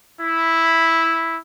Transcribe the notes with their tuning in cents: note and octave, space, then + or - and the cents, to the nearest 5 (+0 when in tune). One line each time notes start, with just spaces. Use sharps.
E4 -5